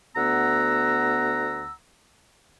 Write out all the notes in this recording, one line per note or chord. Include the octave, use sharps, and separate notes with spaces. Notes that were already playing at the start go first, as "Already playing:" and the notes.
D2 B3 F#5 A#5 E6